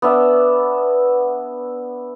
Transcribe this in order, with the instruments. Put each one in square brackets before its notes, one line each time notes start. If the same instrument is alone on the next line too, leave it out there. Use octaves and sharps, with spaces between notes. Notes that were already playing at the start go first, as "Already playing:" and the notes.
[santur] B3 D4 E5